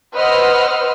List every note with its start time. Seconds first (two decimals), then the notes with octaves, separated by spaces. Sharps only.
0.15 B4 C5 D#5 F#5 E6 F6